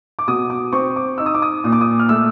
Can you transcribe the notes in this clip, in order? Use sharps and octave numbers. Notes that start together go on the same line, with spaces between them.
D6
B2 D#6
D6
C4 C#6
D6
D#4 E6
D#6
D6
D#6
A#2 D#6
D6
D#6
F6
A3 E6